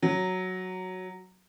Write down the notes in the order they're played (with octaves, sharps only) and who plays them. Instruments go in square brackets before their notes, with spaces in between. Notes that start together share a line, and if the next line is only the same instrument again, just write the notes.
[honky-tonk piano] F#3